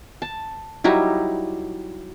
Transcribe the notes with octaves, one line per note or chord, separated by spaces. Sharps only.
A5
F#3 G3 D#4 E4